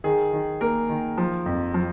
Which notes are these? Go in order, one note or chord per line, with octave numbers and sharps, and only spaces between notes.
D#3 G#4
D#3
A#3 A#4
D#3
F3
F2
F3